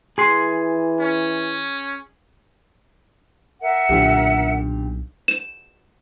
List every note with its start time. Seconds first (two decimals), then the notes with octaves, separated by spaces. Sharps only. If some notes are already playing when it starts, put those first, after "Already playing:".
0.18 E3 G#4 C6
1.00 C#4
3.61 A#4 E5 F#5
3.89 B1 A#2 D3 G4
5.28 E7